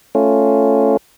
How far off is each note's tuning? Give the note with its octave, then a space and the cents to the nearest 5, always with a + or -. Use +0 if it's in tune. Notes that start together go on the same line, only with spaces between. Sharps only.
A3 +0 C#4 +0 F4 +0